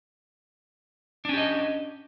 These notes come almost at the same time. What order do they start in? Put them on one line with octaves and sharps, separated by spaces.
D4 C#4 G4 D#5